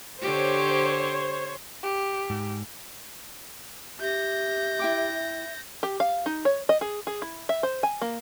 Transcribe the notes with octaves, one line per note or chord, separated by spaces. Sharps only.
D3 G4 C5 C#5
G4
G#2
G4 E5 G6 A#6
E4 G5 D6
G4
F5
D#4
C#5
D#5
G#4
G#4
E4
E5
C5
G#5
A#3